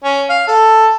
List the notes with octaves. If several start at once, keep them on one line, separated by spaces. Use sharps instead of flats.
C#4
F5
A4